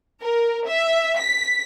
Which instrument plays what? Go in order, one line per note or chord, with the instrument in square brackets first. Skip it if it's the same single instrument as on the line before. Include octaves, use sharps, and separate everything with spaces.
[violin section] A#4
E5
B6